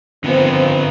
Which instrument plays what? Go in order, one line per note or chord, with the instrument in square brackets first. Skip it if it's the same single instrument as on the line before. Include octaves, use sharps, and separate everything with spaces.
[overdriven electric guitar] D3 B3 [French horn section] D#3 F3 C4